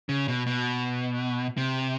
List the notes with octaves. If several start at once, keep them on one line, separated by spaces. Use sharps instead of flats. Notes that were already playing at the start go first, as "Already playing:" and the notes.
C#3
B2
B2
C3